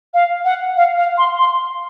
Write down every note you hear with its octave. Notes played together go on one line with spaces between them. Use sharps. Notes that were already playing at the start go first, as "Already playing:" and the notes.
F5
F#5
F5
F5
C6
C6